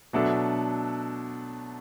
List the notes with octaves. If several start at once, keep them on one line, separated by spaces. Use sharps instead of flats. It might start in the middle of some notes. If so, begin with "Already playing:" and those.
B2 F#3 A3 D4 A4